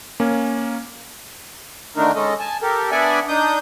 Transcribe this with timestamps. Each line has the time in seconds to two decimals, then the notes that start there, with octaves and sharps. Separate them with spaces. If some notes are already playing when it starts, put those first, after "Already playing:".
0.20 A#3 C#4
1.96 D3 D#3 A3 D4 D#4 A#4
2.15 G#3 C#4 A4 D#5
2.40 G#5 A5
2.62 G4 A4 A#4
2.91 B3 D4 D5 E5 F#5 G#5
3.28 D4 D#4 D#6 G6